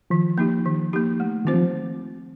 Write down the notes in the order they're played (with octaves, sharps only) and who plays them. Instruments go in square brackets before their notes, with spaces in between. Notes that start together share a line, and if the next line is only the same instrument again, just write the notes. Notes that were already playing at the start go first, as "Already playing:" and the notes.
[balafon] D#3 [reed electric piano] F3
[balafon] A#3 D#4 G4
D#3
A#3 D#4 G4
A3
[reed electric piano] D#3 [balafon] C4 F4 C5
[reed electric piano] F3